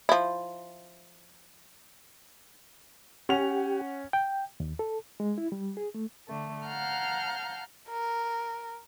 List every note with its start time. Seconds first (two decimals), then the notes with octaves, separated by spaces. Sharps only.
0.09 F3 E4
3.29 C#4 G4 F#5 F7
4.13 G5
4.60 D#2
4.79 A4
5.20 G#3
5.38 E4
5.52 G3
5.77 G#4
5.95 A3
6.29 D3 A3
6.66 F5 F#5 A5 A#5 F6 G6
7.90 A#4